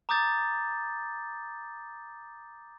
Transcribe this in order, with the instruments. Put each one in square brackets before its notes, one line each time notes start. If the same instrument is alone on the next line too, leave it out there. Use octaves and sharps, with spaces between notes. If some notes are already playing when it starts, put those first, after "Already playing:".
[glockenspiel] A#5 D6 D#6 G6 A6